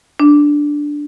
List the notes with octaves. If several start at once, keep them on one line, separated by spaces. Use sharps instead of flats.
D4